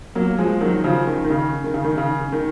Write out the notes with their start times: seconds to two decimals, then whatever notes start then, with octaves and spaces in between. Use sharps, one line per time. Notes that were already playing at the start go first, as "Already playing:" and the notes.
0.15 F#3 A#3
0.38 F3 G#3
0.61 D#3 F#3
0.84 C#3 F3
1.07 D#3
1.24 D#3
1.30 C#3
1.64 D#3
1.74 C#3
1.84 D#3
1.98 C#3
2.32 D#3